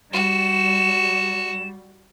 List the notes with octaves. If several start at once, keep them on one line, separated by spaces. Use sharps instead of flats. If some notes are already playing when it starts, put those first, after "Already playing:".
G3 F#4 E7